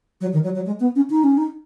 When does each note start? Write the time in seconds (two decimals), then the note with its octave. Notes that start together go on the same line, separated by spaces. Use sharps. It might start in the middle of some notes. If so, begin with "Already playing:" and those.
0.21 F#3
0.33 D#3
0.43 F#3
0.55 F#3
0.66 G#3
0.80 B3
0.96 C#4
1.10 D#4
1.24 C#4
1.37 D#4